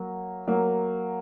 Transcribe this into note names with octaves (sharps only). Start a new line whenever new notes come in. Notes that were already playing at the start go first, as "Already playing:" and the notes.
Already playing: F#3 A#3
F#3 A#3